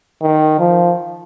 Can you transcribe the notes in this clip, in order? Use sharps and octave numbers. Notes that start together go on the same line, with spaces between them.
D#3
F3